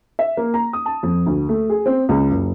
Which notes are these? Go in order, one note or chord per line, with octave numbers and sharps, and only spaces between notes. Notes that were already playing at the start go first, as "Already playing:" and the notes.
E5
A#3
A#5
D#6
A5
F2
D2
A3
G#4
C4
C#2
F#1